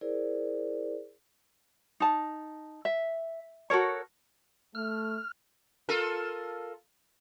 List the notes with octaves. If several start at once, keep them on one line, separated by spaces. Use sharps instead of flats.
E4 G#4 A#4 C5 D5
D#4 A5
E5
F#4 A4 A#4 C#5
A3 F6
F4 A4 A#4